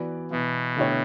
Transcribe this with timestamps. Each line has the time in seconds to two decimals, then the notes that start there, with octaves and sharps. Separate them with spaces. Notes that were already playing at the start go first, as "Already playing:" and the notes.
Already playing: E3 B3 F#4 B4 D5
0.31 B2 E3 B3 E4
0.77 D3 A3 E4 G4 C#5